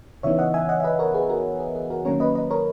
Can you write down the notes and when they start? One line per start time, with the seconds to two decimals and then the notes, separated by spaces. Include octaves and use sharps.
0.23 C#3 E3 B3 D#4 C#5 E5
0.39 D#5 F#5
0.54 E5 G#5
0.69 D#5 F#5
0.80 E5
0.84 B4 D#5
0.99 A#4 C#5
1.14 G#4 B4
1.29 F#4 A#4
1.60 G#4
1.75 G#4
1.90 F#4 A#4
2.05 D#3 F#3 A#3 C#4 A#4 C#5
2.20 B4 D#5
2.35 B4 D#5
2.51 A#4 C#5